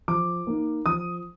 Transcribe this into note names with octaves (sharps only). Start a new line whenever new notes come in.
F3 D6
A#3 D#4
F3 D#6